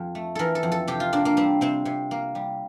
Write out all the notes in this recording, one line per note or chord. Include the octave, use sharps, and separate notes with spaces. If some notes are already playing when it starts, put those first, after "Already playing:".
Already playing: F2
A3
E3 A4 A#4
A4
F2
A4
C3 G4
F4
A#3 D4
A#3
G3 C4
C3 C4
C3
A#3
G3